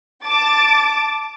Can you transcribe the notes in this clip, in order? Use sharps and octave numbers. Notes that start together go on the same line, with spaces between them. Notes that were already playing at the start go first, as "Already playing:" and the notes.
A5 D6 A6